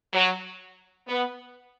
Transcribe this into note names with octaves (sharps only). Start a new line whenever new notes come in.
F#3
B3